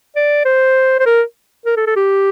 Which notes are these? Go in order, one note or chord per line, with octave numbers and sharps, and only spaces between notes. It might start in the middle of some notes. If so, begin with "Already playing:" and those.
D5
C5
C5
A#4
A#4
A4
A4
G4